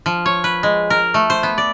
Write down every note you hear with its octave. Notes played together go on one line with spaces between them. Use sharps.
F3
C#5
B4
G#3
A#4
A3
C5
B3
D5